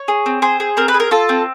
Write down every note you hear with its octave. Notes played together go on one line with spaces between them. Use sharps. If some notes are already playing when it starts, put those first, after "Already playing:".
Already playing: C#5
G#4
C4
G#4 C5
G#4
C4 A#4
B4
G#4
A#4
F4 A4
C4